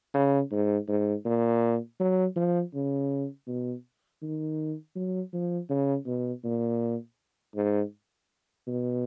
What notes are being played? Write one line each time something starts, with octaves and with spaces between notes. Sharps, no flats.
C#3
G#2
G#2
A#2
F#3
F3
C#3
B2
D#3
F#3
F3
C#3
B2
A#2
G#2
B2